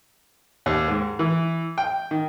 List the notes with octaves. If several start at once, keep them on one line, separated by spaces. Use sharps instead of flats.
D#2
G#2
E3
G5
D#3